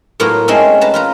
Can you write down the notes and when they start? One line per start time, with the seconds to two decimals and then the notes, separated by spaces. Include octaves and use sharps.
0.20 A2 F#3 A#3 B3 F4 A#5
0.48 G#3 A3 C4 C#4 D#4 A4
0.81 B4 A5 A#5
0.94 F4 B4 A#5